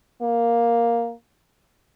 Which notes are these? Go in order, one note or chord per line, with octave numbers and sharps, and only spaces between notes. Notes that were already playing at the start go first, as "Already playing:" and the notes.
A#3